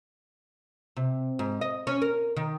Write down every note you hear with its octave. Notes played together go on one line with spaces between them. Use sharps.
C3
G#2
D#5
C#4
A#4
D#3